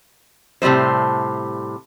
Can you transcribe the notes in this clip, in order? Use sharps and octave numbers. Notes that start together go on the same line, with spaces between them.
A2 C3 G3 G#3 C5